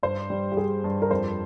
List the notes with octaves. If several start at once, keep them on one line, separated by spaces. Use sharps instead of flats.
G2 C5
G3
G4
G3 G#4
G2
A#4
F2 C5